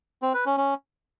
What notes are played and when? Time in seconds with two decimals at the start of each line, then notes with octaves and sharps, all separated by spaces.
0.22 C4
0.34 B4
0.46 C#4
0.57 C#4